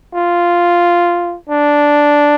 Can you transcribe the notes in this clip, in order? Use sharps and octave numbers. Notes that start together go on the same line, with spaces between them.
F4
D4